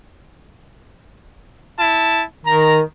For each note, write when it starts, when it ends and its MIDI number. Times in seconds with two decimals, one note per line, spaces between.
1.78 2.23 64
1.78 2.23 81
2.45 2.81 51
2.45 2.78 82